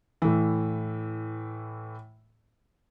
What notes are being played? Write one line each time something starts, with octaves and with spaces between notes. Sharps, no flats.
A2 E3